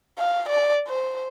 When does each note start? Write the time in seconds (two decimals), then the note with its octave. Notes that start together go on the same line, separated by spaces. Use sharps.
0.18 F5
0.49 D5
0.88 C5